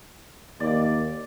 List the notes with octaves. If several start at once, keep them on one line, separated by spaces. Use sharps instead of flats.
D#2 D5 D6